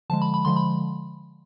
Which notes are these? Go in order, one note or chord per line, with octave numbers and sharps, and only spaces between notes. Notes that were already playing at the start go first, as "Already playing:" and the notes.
D3 F3 G#3 A5
B5
B5
D3 F3 G#3 C6
B5